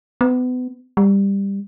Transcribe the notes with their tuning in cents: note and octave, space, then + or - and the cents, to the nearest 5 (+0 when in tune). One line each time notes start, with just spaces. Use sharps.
B3 +30
G3 +15